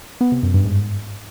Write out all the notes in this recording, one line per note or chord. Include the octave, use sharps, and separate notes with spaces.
B3
C3
F#2
G2
G#2